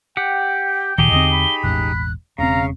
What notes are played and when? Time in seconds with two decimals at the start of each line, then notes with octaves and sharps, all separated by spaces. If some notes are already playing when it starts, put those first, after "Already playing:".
0.17 G4 F#5 G5
0.98 D2 A#2 D#3 D#4 G4 G#4 G7
1.11 E2 D3 C4 D#5
1.32 B5
1.64 E1 A1 F#2 F#6
2.38 E1 C#3 C4 F5 A#5